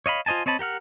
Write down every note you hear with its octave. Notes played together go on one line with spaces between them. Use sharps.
C#5 D#5 F5 B5
F4 C5 D#5 G#5 A5
C4 C#5 D#5 A5 B5
G4 A#4 F#5 F6